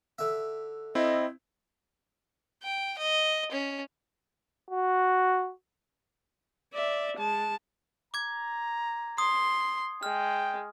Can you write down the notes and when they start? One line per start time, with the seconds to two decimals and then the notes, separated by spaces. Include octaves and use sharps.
0.18 D3 E5
0.95 C4 E4 D#5
2.63 G5
2.98 D#5
3.51 C#4
4.70 F#4
6.74 D5 E5
7.17 G#3 A5
8.14 A#5 D6 G#6
9.18 C6 D#6
10.03 G#3 G5 F6